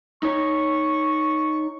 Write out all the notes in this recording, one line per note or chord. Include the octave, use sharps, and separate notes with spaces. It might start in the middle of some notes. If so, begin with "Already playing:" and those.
D#4 C#5 C#6